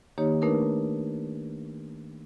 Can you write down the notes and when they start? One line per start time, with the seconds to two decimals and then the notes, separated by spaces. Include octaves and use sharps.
0.18 D#3 A#3 D#4 G4 C#5
0.42 A3 D4 D#4 A#4 B4